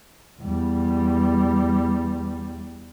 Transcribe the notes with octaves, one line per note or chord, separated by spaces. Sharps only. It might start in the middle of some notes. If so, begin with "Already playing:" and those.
E2 G3